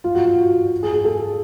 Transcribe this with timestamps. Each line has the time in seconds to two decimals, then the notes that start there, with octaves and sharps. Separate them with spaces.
0.04 F4
0.15 F#4
0.26 F#4
0.83 G#4
0.93 G#4
1.05 A4